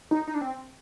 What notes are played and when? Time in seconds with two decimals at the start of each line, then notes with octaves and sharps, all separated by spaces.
0.11 D#4
0.28 D#4
0.35 D4
0.41 C4